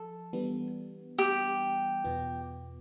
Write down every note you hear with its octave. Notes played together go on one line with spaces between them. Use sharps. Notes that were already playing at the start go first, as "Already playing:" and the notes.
Already playing: F3 A4
E3 G3 B3 D4
G4
E2 B2 B3 F4